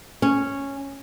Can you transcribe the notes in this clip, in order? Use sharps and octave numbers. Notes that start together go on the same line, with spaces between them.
C#4